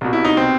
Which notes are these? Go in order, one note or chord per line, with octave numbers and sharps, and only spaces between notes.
C2 B2
E4
D#4
C4